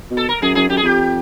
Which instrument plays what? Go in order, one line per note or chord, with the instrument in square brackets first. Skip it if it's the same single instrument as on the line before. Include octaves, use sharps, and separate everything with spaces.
[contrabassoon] B2
[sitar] A4
A#4
[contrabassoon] F#2 [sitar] G#4
[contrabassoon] F#2 [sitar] G#4
[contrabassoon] F#2 [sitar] G4
[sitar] G#4
[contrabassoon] F2 [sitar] G4